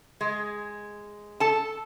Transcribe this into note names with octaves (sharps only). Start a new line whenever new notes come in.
G#3
A4 A5